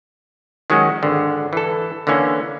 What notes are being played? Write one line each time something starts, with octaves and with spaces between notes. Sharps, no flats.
D#3 F#3 G#3 C#4 F#4
G#1 D3
E3 A4
D3 E3 A#3 C#4